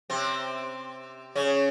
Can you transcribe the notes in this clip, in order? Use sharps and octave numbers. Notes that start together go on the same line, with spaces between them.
C3 C4
C#3 C#4